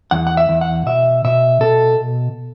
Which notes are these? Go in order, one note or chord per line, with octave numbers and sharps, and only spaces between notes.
E2 F#5
F#5
E5
E2
F#5
B2 E5
B2 E5
B2 A4